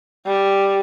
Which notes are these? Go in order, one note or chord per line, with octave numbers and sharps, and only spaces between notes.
G3